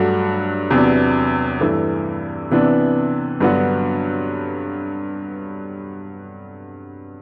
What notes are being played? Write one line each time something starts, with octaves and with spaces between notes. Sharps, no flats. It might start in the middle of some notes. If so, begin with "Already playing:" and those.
Already playing: G2 F#3 A3 D4 F#4
E2 C3 F#3 B3 D4
G2 E3 A3
C3 E3 B3 D4
G2 D3 F#3 B3 F#4